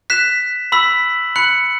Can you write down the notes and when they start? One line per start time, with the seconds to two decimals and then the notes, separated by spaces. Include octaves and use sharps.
0.10 F#6 B6 E7
0.72 B5 E6 B6 F#7
1.36 B5 F#6 C#7 F#7